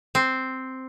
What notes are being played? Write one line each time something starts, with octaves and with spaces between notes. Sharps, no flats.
C4